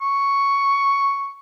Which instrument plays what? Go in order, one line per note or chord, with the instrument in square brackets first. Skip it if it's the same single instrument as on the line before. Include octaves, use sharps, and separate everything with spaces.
[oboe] C#6